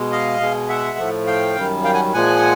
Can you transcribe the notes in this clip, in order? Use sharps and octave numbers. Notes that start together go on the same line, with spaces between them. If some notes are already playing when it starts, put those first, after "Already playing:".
Already playing: B2 G#3
D#5 F5
B2 G#3
E5 F#5
A2 F3 A3
F5 G5
F#2 D#3 G3
F5 G5
F#5 G#5
A#2 F3 G#3 F#5 G#5